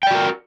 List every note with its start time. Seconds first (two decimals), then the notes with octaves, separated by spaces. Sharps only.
0.03 G5
0.07 D5
0.11 F#4
0.15 A#4